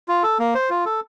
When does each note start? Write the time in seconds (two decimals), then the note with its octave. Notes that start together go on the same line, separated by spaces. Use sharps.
0.08 F4
0.23 A4
0.39 A#3
0.55 C5
0.70 F4
0.85 A4